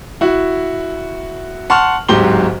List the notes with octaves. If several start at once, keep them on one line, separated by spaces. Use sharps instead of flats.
E4 F#4
F#5 A5 C6 C#6 F6
D1 G#2 F#3 G4 C6 G7